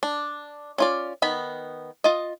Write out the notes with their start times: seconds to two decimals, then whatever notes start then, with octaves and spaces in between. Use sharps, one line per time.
0.03 D4
0.78 C#4 F4 D5
1.22 D#3 B3 B5
2.04 F4 D#5